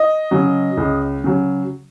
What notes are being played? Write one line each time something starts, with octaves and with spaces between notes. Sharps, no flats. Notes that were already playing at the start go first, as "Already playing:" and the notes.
Already playing: D#5
C#3 F#3
C#2
C#3 F#3